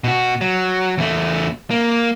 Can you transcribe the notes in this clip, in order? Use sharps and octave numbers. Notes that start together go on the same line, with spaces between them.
B2 F#4
F#3
E2 A3
A#3